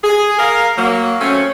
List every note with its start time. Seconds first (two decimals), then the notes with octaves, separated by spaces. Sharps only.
0.03 G#4
0.39 A#4 F5
0.77 F#3 A#3
1.20 F#3 A3 C4 C#4